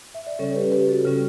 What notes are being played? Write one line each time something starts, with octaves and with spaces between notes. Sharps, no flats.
E5
D5
C#3 G3 C#4 A4 C#5
G4 B4
G4 B4
F#4 A4
C#3 G3 C#4